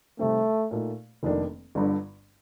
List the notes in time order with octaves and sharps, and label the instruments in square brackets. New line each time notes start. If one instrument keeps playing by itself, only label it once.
[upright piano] C3 D#3 G3 C4 [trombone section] A3
[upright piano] A#2 A3 D#4
F1 F2 D#3 A#3 D4
G1 G2 D3